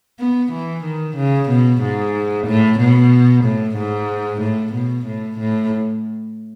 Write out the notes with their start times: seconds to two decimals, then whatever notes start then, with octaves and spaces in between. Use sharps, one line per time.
0.20 B3
0.53 E3
0.84 D#3
1.17 C#3
1.49 B2
1.82 G#2
2.48 A2
2.79 B2
3.45 A2
3.77 G#2
4.42 A2
4.74 B2
5.07 A2
5.40 A2